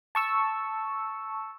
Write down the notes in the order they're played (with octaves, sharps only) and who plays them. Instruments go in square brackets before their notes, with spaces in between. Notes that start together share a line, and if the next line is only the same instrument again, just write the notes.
[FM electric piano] A5 C#6 E6